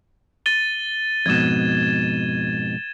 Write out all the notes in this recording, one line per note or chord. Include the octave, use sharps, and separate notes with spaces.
A6 D#7 G7
F2 G#2 B2 G#6 E7